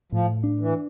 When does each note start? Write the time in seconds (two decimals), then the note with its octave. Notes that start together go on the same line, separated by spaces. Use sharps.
0.12 A2 F3
0.44 D4
0.60 E3